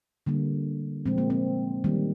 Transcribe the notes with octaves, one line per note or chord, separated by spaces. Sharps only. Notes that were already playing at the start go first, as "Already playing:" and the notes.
D3 G3 A#3
A#2 F3 G#3 C4
A#3
C4
D#3 G3 A#3